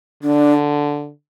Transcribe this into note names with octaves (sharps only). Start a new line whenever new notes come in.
D3 D4